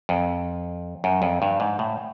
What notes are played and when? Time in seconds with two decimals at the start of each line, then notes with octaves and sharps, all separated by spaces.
0.09 F2
1.04 F#2
1.22 F2
1.42 G2
1.60 G#2
1.79 A2